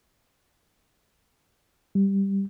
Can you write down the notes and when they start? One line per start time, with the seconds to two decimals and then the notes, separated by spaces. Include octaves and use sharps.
1.95 G3